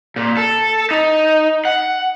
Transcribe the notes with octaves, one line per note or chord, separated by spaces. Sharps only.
A#2
A4
D#4
F#5